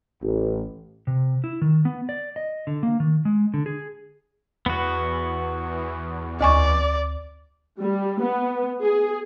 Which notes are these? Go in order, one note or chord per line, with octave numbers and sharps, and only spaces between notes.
A1
C3
E4
D#3
B3
D5
D#5
D3
A#3
D#3
G#3
D3
G#4
E2 B3 F#4
D2 D5 G#5 C#6
G3
B3
G#4